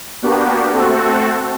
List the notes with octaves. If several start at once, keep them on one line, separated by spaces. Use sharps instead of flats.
A#3 B3 D4 F#4 G4
A3 C4 F#4 A4